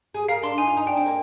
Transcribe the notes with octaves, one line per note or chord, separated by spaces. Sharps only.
G#4
A#4 F5
D4 C6
D#4 G#5
F4
D#4
D4 G5
C4
A#3